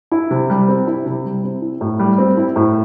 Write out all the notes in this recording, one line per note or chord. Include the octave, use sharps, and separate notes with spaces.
E4
C3
G3
C4
E4
C3
G3
C4
E4
A2
G3
C4
E4
A2